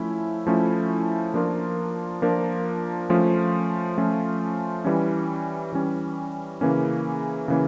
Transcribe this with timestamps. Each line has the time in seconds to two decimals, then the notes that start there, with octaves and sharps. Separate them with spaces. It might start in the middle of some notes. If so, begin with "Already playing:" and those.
Already playing: F3 A3 C#4 E4
0.47 F3 A3 C#4 E4
1.34 F3 A#3 D4 F4 A#4
2.22 F3 A#3 D4 F4 A#4
3.10 F3 A3 C#4 F4
3.98 F3 A3 C#4 F4
4.85 E3 G3 C#4
5.72 E3 G3 C#4
6.61 C#3 E3 A#3 C#4
7.48 C#3 E3 A#3 C#4